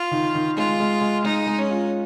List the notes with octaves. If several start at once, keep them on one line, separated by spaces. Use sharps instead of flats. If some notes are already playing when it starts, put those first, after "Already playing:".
Already playing: F4
D#3
D#3
G#3 F4
G#3
G#3
G#3 D#4
G#3
C#4
F4